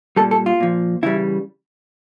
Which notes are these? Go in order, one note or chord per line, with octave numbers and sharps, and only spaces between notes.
A#2 G3 A4
A4
F4
A#2 F3
C#3 E3 G3 E4